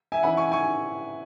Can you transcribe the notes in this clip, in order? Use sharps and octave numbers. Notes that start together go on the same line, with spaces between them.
E5 G#5
E3 C#4 E4 F#5 B5
G#5 C#6
G#5 C#6